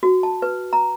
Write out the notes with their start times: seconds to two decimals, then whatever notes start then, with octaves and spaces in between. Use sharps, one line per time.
0.03 F#4
0.23 A5
0.42 B4
0.73 A#5